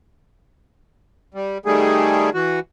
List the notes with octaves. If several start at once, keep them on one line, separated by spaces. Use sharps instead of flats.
G3
D#3 G3 A3 G#4
E3 F#4